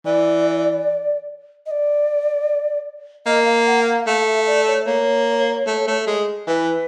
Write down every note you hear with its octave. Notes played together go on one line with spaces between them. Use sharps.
E3 D5
D#5
D5
A#3 D#5
F5
F#5
F5
A3 F5
E5
D5
C#5
A#3 C#5
A3
A3
G#3
E3 B4